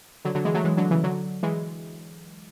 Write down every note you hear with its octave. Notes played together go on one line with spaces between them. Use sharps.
D3 F#3
D3 F#3
E3 G#3
F#3 A3
E3 G#3
D3 F#3
C#3 E3
D3 F#3
E3 G#3